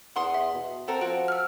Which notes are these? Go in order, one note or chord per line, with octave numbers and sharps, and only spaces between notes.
E2 F#5 C6 D#6
E5
B2
C4 F#4 A4 A#4
F3 F#4 D7
E6 F6